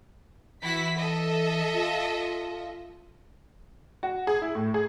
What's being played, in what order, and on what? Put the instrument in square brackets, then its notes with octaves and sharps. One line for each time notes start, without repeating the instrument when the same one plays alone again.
[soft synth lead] E3 [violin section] E4 F#4 B6
[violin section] A4 D#5 E5
[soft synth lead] F4
[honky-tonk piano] F#4
G#4
E4
A2
G#4